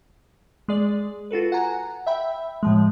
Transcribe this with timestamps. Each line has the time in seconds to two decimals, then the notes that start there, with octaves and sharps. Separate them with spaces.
0.68 G#3 G#4 D5
1.31 F4 F#4 A4 B4
1.52 F#5 G#5 A#5
2.07 E5 G5 B5
2.63 A2 F3 G#3